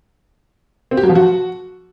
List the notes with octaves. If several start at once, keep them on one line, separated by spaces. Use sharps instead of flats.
C4
G4
F#3
F3
F#4